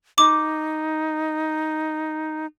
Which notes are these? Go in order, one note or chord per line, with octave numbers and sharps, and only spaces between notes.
D#4 D6